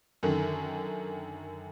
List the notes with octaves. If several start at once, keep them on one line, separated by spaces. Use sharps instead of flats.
F#2 D3 D#3